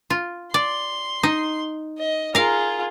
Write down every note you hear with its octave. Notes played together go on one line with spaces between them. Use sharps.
F4
D5 C6
D#4
D#5
F4 G#4 A#4 F5